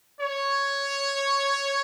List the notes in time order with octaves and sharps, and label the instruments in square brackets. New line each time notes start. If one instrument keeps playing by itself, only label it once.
[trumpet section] C#5